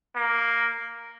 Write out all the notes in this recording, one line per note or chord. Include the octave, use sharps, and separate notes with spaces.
A#3